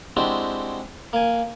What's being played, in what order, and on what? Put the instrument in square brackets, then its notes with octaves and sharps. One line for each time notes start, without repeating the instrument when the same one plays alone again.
[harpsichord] G#3 C4 D4 E4 F#4 G4
A#3 G#5